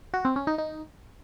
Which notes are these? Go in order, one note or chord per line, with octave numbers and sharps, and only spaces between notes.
F#4
C4
C#4
D#4
D#4